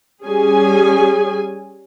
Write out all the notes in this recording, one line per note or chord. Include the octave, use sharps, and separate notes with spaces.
G3 C#4 G#4 G#5